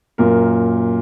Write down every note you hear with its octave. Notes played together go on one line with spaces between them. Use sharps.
F#2 A#2 A#4